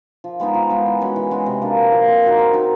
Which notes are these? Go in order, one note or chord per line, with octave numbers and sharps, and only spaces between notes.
F3
G#3 B3 D#4
F3
G#3 B3 D#4
E3
G#3 C#4 F#4
E3
G#3 C#4 F#4
C3
F3 A#3 D4
C3
F3 A#3 D4
C4
D#4 F#4 A#4
C4
D#4 F#4 A#4